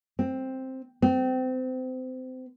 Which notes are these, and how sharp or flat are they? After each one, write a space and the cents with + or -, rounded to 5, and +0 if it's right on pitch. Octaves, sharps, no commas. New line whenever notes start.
C4 +5
C4 -30